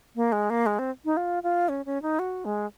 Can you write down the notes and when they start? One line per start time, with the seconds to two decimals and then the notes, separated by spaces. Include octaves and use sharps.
0.16 A#3
0.32 G#3
0.50 A#3
0.66 G#3
0.79 C4
1.05 D#4
1.17 F4
1.43 F4
1.69 C#4
1.86 C#4
2.02 D#4
2.19 F#4
2.45 G#3